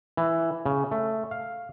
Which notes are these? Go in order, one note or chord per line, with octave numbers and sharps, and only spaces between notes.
E3
C#3
A3
F5